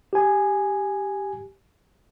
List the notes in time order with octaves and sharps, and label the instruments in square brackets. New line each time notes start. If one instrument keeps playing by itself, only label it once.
[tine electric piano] G4 G#5